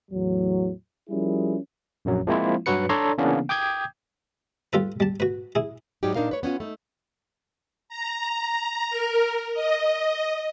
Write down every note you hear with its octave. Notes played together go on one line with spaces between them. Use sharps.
E2 A2 F#3
F3 G3 C#4 E4 G#4 A#4
A#1 F#2 F#3
F3 G#3 A#3 C4 E4 F4
G2 F#3 F#4 B4 C#7
D4 A4 C#5 D5 A#5 C6
C#3 E3 A#3 B3 C#4 D4
G5 D6 D#6 G6 G#6
G3 F4 A4 B4
G3 A5
F#4 B4
E4 G#4
G#2 F#3 G3 D#4 G4
A#2 D4 D#4 A#4 F5
B4 C#5
B3 C#4 D4 F4
A3 D#4
A#5
A#4
D#5